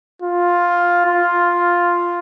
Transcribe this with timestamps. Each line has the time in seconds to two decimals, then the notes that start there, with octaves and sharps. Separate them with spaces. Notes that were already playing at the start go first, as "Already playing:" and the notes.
0.22 F4
1.06 F4